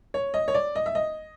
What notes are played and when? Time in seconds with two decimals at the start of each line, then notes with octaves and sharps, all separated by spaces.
0.14 C#5
0.34 D#5
0.48 C#5
0.54 D5
0.76 D#5
0.86 E5
0.95 D#5